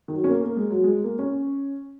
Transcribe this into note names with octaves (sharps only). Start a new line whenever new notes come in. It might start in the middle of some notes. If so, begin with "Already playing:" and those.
D#3
F#3
C#4
A#3
A#3
G#3
F#3
G#3
A#3
C#4